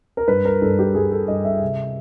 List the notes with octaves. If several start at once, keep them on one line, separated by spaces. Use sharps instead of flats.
A#4
G2 B4
A#4
G2 A4
G4
G2 G#4
A4
G2 D#5
E5
C3